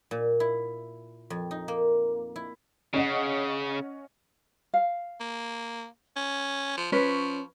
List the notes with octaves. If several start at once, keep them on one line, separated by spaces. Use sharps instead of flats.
A#2
E4
F2
D#4
A#3
E4
C#3 C#4 D#5 F#5
F5
A#3
C#4
F3
F3 C#4 B4 C#5